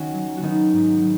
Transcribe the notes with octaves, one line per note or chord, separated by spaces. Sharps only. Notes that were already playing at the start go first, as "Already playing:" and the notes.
Already playing: D#3 C#4 F#4
F#3
F#4
D#3 B3 D#4
G#2
F#3